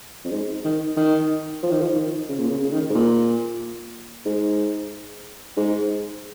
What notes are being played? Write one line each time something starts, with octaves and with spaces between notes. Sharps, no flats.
F2
G#2
D#3
D#3
F3
D#3
F3
D#3
C#3
A#2
C#3
C#3
D#3
G#2
A#2
G#2
G#2